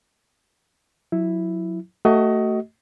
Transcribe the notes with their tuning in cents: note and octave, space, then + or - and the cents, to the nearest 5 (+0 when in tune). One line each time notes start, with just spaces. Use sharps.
F#3 -30 E4 +0
A3 +20 F#4 +30 D#5 +20